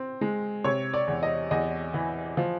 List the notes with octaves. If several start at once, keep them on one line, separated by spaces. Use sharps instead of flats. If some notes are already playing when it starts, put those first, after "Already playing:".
Already playing: C4
G#3
C3 C#5
D5
E2
D#5
E2 D#5
E3
F3